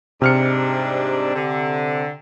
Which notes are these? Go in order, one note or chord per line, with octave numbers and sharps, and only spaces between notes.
G#2 C3 G3 D4 F6 C#7
D3